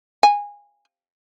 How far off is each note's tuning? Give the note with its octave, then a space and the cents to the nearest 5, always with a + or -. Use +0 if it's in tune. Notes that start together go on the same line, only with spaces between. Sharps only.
G#5 -20